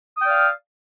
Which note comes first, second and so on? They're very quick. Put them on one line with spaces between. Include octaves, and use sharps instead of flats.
D#6 G5 D5 F6 F5